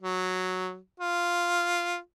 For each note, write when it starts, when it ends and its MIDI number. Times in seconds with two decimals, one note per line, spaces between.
0.02 0.77 54
1.00 1.97 65